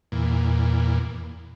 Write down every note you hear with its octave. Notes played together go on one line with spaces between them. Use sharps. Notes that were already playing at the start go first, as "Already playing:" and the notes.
E2 A#2